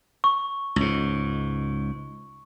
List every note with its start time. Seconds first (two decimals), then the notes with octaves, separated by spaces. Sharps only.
0.24 C#6
0.76 C#2 G#2